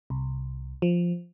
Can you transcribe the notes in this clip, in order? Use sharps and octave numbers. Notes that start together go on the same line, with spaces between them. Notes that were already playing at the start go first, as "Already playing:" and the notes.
C2
F3